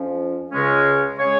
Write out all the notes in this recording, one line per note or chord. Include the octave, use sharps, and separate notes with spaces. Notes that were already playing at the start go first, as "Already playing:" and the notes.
Already playing: F2 F3 C#4
C#2 C#3 G#3 C#4
C#3 G#3 C#4 G#4 C#5